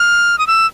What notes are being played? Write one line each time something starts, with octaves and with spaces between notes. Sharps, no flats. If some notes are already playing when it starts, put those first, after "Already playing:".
Already playing: F6
D#6
E6